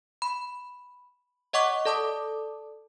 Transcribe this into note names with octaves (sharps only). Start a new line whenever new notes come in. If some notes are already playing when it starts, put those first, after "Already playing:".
B5
C#5 D#5 F#5 C#6 D6 B6
A4 D5 A5 D6 D#6